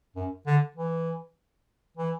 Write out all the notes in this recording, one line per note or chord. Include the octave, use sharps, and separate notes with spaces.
F#2
D3
E3
E3